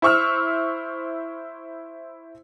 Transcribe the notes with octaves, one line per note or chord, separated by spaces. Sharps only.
E4 C5 C#6 E6 F6